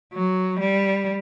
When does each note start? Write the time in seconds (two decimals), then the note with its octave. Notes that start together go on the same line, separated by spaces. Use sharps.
0.14 F#3
0.60 G3